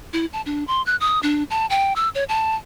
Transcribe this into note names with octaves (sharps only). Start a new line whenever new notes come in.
E4
A5
D4
C6
F#6
D#6
D4
A5
G5
E6
C#5
A5